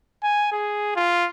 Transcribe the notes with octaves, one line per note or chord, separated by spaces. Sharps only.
G#5
G#4
F4